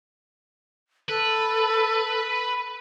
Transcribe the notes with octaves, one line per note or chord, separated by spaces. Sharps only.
A4 B4